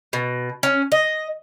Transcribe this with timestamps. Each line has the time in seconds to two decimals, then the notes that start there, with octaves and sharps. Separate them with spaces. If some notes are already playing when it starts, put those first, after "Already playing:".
0.13 B2
0.63 C#4
0.92 D#5